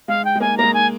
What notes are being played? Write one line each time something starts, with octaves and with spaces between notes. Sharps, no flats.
G#3 F5
G5
G#3
A#3 G#5
A#3 A#5
G#3
G#5